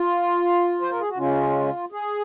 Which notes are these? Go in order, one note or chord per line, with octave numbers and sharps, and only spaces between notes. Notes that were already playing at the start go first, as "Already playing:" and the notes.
Already playing: F4
C5
A#4
G#4
F#4
C#3 G#3 C#4 F4
G#4